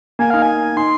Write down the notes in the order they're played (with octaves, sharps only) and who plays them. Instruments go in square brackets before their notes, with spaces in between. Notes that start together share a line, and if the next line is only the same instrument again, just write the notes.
[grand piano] A#3 [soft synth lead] G#5
[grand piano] D#4 [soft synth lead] F5
[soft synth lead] G#5
[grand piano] D#4 [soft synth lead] C6